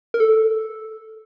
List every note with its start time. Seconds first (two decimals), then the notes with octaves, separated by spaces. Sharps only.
0.14 A#4
0.20 A4